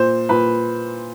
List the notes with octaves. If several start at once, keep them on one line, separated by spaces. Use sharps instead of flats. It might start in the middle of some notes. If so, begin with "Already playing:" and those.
Already playing: A#2 C5
A#2 B4